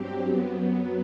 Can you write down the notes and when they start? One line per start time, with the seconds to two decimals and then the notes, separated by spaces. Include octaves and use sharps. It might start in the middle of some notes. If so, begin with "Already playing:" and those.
Already playing: G2 F#3 C4 G4
0.26 F#2 F#3 B3